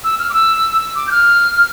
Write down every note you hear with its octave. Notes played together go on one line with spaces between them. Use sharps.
E6
F6
D6
E6
D6
G6
F6